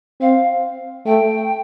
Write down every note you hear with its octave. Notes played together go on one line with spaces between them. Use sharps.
C4 F5
A3 G5